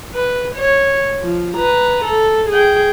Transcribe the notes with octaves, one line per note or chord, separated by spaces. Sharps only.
B4
C#5
F3
B4 A#5
A4
G#4 G5